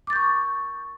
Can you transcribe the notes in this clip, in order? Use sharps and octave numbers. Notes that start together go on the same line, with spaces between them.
C#6 D6 G6 A6